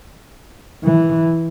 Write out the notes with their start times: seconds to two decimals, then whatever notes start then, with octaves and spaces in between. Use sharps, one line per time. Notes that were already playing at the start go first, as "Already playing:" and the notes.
0.84 E3